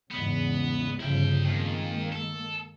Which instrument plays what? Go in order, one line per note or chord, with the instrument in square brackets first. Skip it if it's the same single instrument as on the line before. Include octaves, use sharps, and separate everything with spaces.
[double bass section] E2 G#2 C#3 [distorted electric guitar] B3
[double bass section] G1 C#3 F3 [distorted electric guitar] E4 G5
[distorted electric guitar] F2 [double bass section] D#3 G#3 A#3
[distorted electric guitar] A4